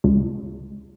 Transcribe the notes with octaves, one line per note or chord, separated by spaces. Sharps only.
C#2